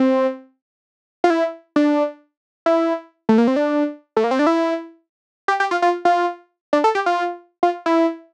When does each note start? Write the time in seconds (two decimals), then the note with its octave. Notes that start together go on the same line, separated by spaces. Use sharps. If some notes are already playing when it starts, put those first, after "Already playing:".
Already playing: C4
1.24 F4
1.30 E4
1.76 D4
2.66 E4
3.29 A3
3.38 A#3
3.47 C4
3.56 D4
4.17 A3
4.24 A#3
4.31 C4
4.39 D4
4.47 E4
5.48 G4
5.60 G4
5.71 F4
5.82 F4
6.05 F4
6.73 D4
6.84 A4
6.95 G4
7.06 F4
7.63 F4
7.86 E4